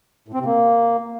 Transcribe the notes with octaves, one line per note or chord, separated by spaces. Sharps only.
A2
C4
C3
A#3